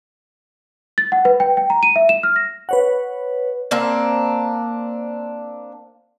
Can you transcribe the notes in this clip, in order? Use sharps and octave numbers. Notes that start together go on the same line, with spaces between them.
A6
F#5
B4
G5
G5
A#5
D#7
E5
E7
F6
A#6
B4 C#5 F#5
A#3 C4 D4